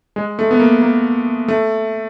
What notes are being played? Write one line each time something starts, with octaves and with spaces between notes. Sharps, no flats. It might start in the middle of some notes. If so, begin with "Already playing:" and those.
G#3
A3
B3
A#3
A#3
A3